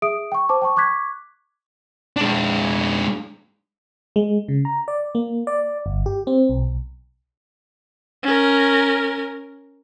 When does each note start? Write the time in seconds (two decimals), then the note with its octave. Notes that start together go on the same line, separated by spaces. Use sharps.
0.02 G#4 E5 D#6 D7
0.32 G5 C#6
0.49 C5 A5 D6
0.62 G5 A5 C#6
0.77 C#6 D6 F#6 G#6 B6
2.17 G#3 D4
4.16 G#3
4.48 C#3
4.65 A#5
4.88 D5
5.15 A#3
5.47 D5
5.86 G1
6.06 G4
6.27 C4
6.49 B1
8.23 C#4 A#4